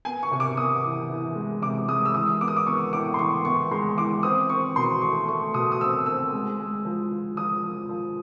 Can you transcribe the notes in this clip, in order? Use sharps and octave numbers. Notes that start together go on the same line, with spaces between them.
B3 G#5
C#6
C3
D6
B3 D#6
E3
E3
G#3
C3 D6
G#3 D#6
E6
E3 D#6
B3 D6
D#6
D6
B3 C#6
A2 D6
C6
E3 C#6
B3 C#6
G#3 C6
E3 D6
C4 D#6
C4 C#6
B2 C6
A3 C#6
A3 C#6
B2 D#6
D#6
C4 E6
C4 E6
G#3
G#3
F3
F3
F3 D#6
F3
F3